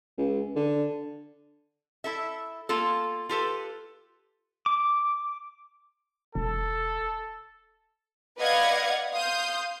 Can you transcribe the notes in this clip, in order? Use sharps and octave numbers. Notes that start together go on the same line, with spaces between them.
C#2
D3
E4 A4 E5
A#3 F4 A4
F4 G4 A4 B4
D6
E1 A4
B4 D5 D#5 F5 F#5 G#6
F5 C6 D#6 G6